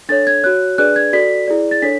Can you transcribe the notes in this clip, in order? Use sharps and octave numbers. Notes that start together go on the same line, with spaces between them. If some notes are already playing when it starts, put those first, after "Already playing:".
D4 A4 C#5 A6
G#6
F#4 C#5 F#6
D4 G#4 B4 D5 F#6
G#6
F#4 A4 D5 B6
E4 G#4 D5
A6
D4 A4 C#5 B6